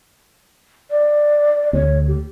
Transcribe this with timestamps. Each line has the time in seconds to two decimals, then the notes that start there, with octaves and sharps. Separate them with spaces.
0.90 D5
1.73 D2 C#5
2.07 G4